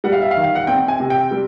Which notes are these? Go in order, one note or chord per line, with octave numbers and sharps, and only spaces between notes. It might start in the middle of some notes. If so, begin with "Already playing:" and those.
G3 F#5
F5
E5
F5
D#3
F5
F#5
C4 G5
G#5
C3
G5
G3